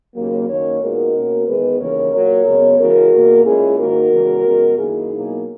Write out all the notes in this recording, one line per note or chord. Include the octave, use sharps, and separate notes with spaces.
D#2 C#3 F#3 A#3
F#2 D#3 A#3 C#4 A#4 C#5
A#2 G#3 B3 D#4 F#4 A#4
B2 A#3 C#4
E2 D#3 G#3 B3 G#4 B4
D#2 C#3 E3 A#3 A#4 C#5
A#2 F#3 A#3 A#4 C#5
F#2 C#3 G#3 B3
C#3 E3 G#3 F#4 A#4
E2 B2 A#3
A#2 G#3 C#4 E4 G#4
G#2 D#3 A#3 D#4 F#4 A#4
E2 C#3 E3 G#3
F#2 C#3 G#3 B3
F#2 D#3 A#3 D#4 E4 G#4
B2 F#3 A#3 D#4